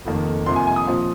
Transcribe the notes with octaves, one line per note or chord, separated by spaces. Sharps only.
F1 F2 D#3 A#3
C2 C3 F3 A#3 C6
G#5
G#5
D#6
A#2 F3 C4 F4